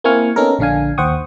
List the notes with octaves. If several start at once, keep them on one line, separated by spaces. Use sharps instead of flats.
A#3 C4 E4 G#5 C#6 F6
B3 C#4 D#4 A4 A#4
A#1 D3 D4 F5 G#5
D#2 C5 F#5 G5 C#6 D#6